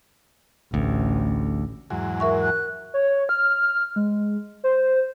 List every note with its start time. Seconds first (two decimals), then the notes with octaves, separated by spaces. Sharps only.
0.74 A1 D2
1.90 E2 G#2 F#3
2.20 A#4 E5 C#6
2.42 F#6
2.94 C#5
3.29 F6
3.96 G#3
4.64 C5